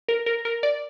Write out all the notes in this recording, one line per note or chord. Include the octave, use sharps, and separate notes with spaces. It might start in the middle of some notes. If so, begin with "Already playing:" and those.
A#4
A#4
A#4
D5